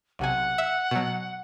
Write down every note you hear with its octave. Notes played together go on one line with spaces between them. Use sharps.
B1 C3 F#5 G#5
E5
B2 F#3